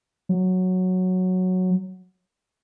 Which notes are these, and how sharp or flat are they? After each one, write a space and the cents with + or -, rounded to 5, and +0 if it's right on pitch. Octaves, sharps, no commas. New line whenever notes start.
F#3 -5